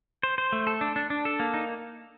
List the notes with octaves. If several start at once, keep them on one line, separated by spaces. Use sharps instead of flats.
C5
C5
A3
A4
D4
D4
D4
A4
A#3
D#4